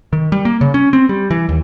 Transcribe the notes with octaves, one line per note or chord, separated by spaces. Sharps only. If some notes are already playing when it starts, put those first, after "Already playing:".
D#3
G3
A#3
C#3
C#4
C4
G3
E3
D#2